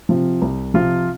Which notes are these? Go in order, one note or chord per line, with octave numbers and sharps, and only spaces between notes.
C3 F3 C4 F4
C2
C3 F3 C4 F4